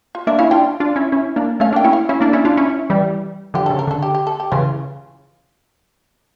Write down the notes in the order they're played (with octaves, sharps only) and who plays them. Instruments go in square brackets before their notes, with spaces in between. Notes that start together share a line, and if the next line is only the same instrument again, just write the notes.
[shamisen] F4
[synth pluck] A#3 D4 [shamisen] E5
[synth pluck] C#4 E4 [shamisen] F5
[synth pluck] D4 F4 [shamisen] G5
[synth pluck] D4 F4
C#4 E4
C#4 E4
A#3 D4
[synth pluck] A3 C#4 [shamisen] F5
[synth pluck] A#3 D4 [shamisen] G5
[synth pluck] C#4 E4
[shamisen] F5
[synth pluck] C#4 E4 [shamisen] F5
[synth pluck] A#3 D4
C#4 E4
D4 F4
C#4 E4
E3 G3
[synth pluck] D3 F3 [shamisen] G4
[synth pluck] C#3 [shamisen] A4
[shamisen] A#4
[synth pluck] D3 [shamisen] A4
[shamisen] G4
G4
A4
G4
[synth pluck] C#3 E3 [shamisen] F4